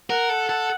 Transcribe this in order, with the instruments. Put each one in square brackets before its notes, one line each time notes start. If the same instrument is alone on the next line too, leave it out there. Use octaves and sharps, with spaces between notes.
[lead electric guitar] A#4 [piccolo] F#5
[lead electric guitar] A4
A4